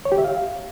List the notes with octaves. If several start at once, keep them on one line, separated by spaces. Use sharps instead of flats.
C#5
G4
E5
F5